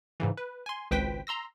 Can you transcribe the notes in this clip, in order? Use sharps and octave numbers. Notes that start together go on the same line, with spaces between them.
G#2 C#3 E3
B4
G#5 C6
G#1 C#2 B4 C5 G5 B6
A#5 C6 E6 A#6